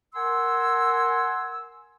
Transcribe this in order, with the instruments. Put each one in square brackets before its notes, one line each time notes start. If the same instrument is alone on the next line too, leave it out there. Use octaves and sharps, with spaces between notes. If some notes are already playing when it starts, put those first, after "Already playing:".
[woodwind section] A#4 F#5 G#5 C6 E6